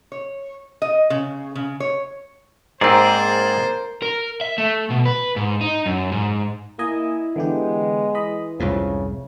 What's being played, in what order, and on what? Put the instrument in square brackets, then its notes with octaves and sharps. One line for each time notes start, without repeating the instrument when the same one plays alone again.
[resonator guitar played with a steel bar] C#5
D#5
C#3
C#3
C#5
[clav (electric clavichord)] G#2 C4 [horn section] A#3 C5 [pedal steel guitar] G#4 D5 [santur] A#4
[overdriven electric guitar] A#4
E5
A3
B2
B4
G#2
D#4
F#2
G#2
[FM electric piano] A#3 D#5 G#5 [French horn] E4
[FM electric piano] D3 E3 G4 [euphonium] G#3 [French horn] B3
[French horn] E3 [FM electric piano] D#5 B5
[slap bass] C2 F2 G#2 [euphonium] C#3 [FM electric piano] F3